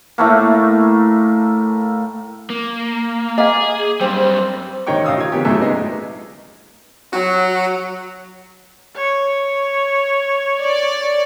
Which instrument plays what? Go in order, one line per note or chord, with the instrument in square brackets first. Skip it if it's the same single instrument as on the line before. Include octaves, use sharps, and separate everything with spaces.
[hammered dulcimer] A2 A3 A#3
[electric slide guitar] A#3
[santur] A#3 [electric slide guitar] G#4 [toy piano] D#5 F5
[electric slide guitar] F#2 G3 [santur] C4 [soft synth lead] C5
[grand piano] A1 D#3 D#4 C#5 G5 C#6
A1 F5 D#6 E6
F4 G#6
C#3 E3 A#3 C#4 G4
G#1 F#2 A#2 A3 E5 E6
G#3 B3 D#4
[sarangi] F#3 [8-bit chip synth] F#4
[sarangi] C#5
[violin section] D5